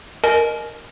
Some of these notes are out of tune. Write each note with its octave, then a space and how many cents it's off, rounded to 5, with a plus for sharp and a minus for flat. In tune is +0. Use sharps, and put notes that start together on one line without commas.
A#4 +0 D#5 -15 G#5 +40